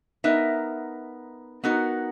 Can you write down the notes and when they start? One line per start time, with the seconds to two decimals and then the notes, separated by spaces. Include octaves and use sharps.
0.24 B3 D#4 A#4 E5
1.64 B3 D#4 F#4 A#4